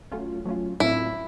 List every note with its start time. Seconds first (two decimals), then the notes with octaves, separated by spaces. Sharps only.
0.11 F#3 A3 C#4 F4
0.45 F#3 A3 C#4 F4
0.80 A2 F#3 A3 C4 E4 F4